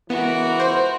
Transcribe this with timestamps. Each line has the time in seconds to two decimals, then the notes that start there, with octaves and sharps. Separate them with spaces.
0.10 C#2 E3 B3 F#4 A#4
0.60 C5